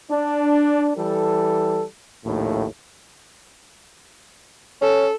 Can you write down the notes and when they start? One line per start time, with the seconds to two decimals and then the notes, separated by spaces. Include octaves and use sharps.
0.10 D4
0.97 E3 G3 A4
2.25 A#1 D#2 A2
4.82 C#4 A4